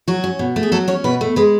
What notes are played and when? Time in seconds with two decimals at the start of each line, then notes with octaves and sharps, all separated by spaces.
0.08 F#3 F#4
0.24 C#4
0.39 B2
0.56 A3
0.63 G#4
0.72 F#3 A4
0.88 C#4 C#5
1.04 B2 B4
1.21 A3
1.36 G#3 B4